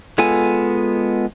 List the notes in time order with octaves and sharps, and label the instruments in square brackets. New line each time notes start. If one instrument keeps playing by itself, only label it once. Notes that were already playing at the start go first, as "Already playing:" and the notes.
[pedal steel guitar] G#3 B3 F4 A4 G#5